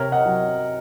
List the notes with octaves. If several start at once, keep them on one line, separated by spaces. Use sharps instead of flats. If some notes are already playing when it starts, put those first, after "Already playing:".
Already playing: C3 A#4 C#5
D#5 F#5
F#3